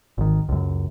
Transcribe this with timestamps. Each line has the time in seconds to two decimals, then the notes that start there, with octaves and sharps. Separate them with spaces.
0.18 G#1 D#3
0.49 C#2 F#2